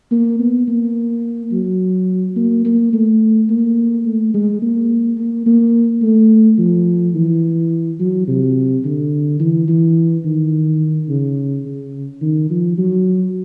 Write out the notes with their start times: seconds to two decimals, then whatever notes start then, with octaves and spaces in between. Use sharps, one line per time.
0.12 A#3
0.39 B3
0.68 A#3
1.52 F#3
2.36 A#3
2.65 A#3
2.93 A3
3.50 A#3
4.05 A3
4.34 G#3
4.62 A#3
5.18 A#3
5.46 A#3
6.02 A3
6.59 F3
7.15 E3
8.00 F#3
8.28 C3
8.85 D3
9.40 E3
9.68 E3
10.25 D#3
11.09 C#3
11.65 C#3
12.22 D#3
12.50 F3
12.78 F#3